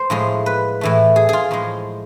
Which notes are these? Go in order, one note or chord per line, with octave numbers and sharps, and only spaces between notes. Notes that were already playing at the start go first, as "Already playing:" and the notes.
Already playing: C5
A2 F3 G#3
B4
A2 E3 A3
G#4
F4 G#4
A2 F3 G#3